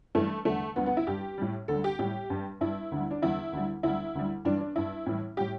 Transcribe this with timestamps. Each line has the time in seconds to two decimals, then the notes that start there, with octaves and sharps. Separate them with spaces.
0.15 G2 E3 G3 A3
0.45 E2 D3 G3 A3
0.76 D2 D3 G3 B3
0.86 B3
0.97 E4
1.07 G2 G3 G4
1.38 A2 G3
1.68 D2 D3 G3 A4
1.84 G4
1.99 A2 G3 G4
2.30 G2 G3
2.61 G2 G3 E4
2.91 D2 D3 G3
3.11 D4
3.22 E2 D3 G3 E4
3.53 D2 D3 G3
3.83 D2 D3 G3 E4
4.15 D2 D3 G3
4.45 G2 E3 G3 D4
4.60 D4
4.76 G2 G3 E4
5.06 A2 E3 G3
5.37 A2 G3 G4